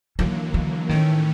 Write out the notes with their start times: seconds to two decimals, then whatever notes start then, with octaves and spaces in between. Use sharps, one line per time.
0.19 D#2 D3 E3 F#3 A#3
0.54 E3
0.89 A2 D#3 E3 A3 C#4